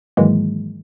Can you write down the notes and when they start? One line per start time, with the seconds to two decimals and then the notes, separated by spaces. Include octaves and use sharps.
0.17 G#2 D#3 E3 F#3 G#3 A#3